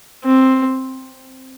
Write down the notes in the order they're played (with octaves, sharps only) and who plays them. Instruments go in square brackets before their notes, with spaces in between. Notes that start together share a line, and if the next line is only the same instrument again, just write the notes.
[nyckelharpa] C4